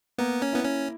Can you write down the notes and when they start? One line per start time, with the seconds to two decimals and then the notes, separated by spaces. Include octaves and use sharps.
0.18 A#3 B3
0.42 C#4
0.53 B3 E4
0.64 C#4